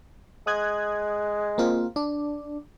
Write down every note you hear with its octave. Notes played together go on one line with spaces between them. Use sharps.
G#3 D#6 F#6 G#6
A#3 C4 F4
D4